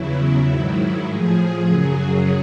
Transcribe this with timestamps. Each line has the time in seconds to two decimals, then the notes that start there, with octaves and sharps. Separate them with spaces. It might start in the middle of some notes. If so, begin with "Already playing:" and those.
Already playing: E2 C#3 F#3 E4
0.46 G#2 D#3 F#3
1.06 A2 F3 G#4
1.66 F#2 C#3 F#3